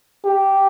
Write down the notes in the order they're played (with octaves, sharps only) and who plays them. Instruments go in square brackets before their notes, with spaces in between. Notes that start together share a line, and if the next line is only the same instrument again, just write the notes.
[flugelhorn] G4